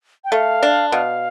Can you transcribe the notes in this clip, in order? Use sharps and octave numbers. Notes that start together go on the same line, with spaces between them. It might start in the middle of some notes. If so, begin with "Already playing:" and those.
G5
A3 F5
D4
B2 F5